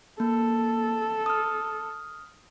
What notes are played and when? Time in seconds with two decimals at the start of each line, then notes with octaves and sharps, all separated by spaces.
0.20 A#3 A4
1.26 D#6 F6